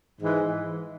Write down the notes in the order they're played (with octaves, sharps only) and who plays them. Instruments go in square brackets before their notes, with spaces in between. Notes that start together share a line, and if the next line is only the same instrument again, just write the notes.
[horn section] G#2 E3 G#3